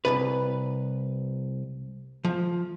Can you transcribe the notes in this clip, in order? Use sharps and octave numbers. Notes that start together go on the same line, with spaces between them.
C2 G2 B4
F3